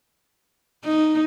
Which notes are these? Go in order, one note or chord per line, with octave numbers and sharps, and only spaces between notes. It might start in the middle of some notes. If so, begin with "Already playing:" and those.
D#4